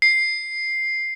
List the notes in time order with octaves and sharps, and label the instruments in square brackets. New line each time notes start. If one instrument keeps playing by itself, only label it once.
[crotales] C7